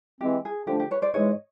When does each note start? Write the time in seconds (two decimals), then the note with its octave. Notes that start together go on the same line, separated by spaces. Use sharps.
0.21 E3 G#3 C4 G4
0.45 G#4
0.67 D3 F3 A3 D4 G4
0.80 G4
0.91 B4 C#5
1.02 C5 D5
1.14 G#2 E3 G#3 C#5 D#5